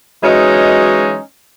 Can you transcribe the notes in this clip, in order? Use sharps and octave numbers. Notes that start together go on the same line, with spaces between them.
E3 F#3 G#3 C#4 D#4